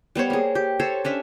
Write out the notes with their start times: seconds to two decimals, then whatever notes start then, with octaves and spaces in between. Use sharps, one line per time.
0.15 G3 B3 C5 C#5
0.30 A#3 G#4
0.55 G4
0.80 A4 C5 C#5
1.05 C#4 D4 E5